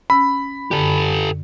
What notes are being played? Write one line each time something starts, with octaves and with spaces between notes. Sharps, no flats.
C#4 B5 E6
F#2 D3 G4 A4